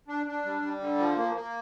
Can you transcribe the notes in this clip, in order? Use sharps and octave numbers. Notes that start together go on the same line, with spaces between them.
D4
D4
G3
G3
D3
F3
A#3
A#3